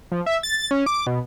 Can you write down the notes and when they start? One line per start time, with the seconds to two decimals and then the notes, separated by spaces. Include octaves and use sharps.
0.12 F3
0.26 E5
0.43 A6
0.71 C#4
0.86 D6
1.07 B2